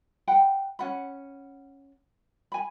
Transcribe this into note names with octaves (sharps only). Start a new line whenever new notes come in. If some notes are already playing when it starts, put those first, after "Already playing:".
F#5 G5 B5
C#4 F#5 B5
G#5 B5